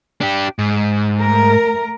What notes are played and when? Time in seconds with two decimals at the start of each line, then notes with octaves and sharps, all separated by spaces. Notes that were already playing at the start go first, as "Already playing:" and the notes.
0.21 D4 G4
0.59 G#2
1.20 A3 A#4